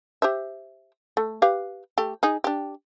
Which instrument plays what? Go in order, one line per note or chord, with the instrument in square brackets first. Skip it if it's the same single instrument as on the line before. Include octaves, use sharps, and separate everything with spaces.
[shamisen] G4 C5 E5
A3
G4 B4 F5
A3 G4
D#4 G#4
D4 G4